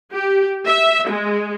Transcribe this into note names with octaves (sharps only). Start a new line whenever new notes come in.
G4
E5
G#3